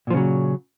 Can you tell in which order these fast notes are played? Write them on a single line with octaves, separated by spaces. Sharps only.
A#2 F3 C#3 F#3